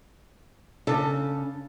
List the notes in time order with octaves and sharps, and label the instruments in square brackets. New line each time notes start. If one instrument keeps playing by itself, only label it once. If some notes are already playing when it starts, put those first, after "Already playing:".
[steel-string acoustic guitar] C#3 [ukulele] D4 A4